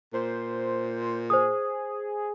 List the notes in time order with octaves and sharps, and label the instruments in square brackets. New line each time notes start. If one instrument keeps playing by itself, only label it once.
[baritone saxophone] A#2 [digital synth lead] C5
[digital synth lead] G#4 [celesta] C5 D#6